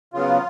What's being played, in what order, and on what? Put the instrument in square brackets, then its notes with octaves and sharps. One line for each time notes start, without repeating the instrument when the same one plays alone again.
[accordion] C#3 F#3 B3 F4